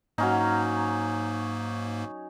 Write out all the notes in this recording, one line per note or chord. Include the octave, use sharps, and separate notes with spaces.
G#2 F#3 A#3 C#4 D#4